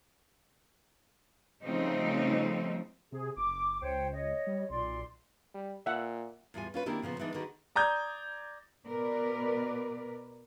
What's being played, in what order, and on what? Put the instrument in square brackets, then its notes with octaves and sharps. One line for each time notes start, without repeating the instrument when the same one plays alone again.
[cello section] C#3 F3 G3 A3 C4 D#4
[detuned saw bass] C3 [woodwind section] G#4
[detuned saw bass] F#1 [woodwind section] D6
[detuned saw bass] C#2 [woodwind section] C5 C#5 G5
[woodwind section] C#5 D#5
[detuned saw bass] G3
[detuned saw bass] B1 [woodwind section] A#2 D5 C6
[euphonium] G3
[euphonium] A#2 [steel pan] E5 F#5
[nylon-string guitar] E2 A2 G3 F4 G#5
C#4 F4 B4
D#3 A#3 C4 D4 E4 G4
A#2 C#3 F3 B3
E3 G#3 B3 D4 D#4
D3 D#3 D#4 F#4 G#4 B4
[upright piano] D5 A#5 D#6 G6 G#6
[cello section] B2 A#4 B4 D5